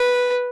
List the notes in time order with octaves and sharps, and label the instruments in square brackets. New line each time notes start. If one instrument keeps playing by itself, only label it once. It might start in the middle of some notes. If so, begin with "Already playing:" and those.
Already playing: [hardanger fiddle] B4